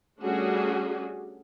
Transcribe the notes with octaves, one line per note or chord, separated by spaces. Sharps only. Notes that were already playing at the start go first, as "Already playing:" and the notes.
G3 A3 C#4 D4 F#4 G#4